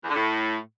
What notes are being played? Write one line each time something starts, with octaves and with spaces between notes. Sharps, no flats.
E2
D3
A2